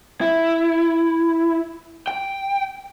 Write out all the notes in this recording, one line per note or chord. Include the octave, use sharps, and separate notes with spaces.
E4
G5